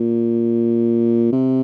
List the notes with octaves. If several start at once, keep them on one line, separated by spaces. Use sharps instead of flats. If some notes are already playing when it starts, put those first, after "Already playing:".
Already playing: A#2
C3